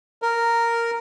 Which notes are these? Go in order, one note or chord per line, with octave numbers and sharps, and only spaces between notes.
A#4